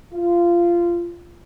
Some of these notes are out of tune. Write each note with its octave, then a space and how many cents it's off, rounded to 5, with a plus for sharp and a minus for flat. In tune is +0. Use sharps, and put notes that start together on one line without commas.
F4 -20